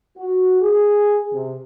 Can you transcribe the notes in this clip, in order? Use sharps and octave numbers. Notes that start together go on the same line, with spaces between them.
F#4
G#4
C3